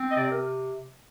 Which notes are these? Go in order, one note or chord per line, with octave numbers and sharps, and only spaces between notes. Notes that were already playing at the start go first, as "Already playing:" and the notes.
Already playing: C4
D#5
C3 D5
A#4